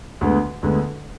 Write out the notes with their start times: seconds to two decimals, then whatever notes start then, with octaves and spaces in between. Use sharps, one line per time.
0.21 D2 D3 G#3 B3
0.63 D2 D3 G#3 B3